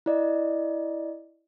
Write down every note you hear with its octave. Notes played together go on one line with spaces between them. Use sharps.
E4 D5 D#5